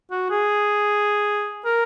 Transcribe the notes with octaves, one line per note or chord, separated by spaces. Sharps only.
F#4
G#4
A#4